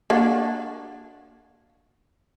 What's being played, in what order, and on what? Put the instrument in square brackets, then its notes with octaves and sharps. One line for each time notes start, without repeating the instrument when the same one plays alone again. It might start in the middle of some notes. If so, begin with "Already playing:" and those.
[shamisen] A#3 D4 F#4